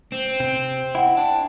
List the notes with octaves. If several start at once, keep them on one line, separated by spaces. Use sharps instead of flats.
C4
C3
E4 F#5 G5
D4 A5